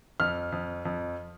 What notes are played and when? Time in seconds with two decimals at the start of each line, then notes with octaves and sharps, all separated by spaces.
0.20 F2 F6
0.52 F2
0.85 F2